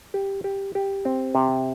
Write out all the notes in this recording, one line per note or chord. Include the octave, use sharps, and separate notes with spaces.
G4
G4
G4
C4
C3